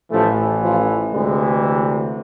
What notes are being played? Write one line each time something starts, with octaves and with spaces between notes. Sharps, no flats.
A1 A2 E3 F3 A3
F3
D2 C3 E3 G#3